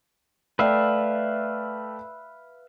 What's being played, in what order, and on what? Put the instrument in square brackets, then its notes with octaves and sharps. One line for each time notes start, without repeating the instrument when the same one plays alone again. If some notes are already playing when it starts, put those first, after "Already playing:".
[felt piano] A3 D5 G5 [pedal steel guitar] B4 E5 F5